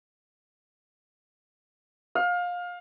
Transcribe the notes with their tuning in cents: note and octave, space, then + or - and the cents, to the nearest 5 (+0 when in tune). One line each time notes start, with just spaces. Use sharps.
F5 +25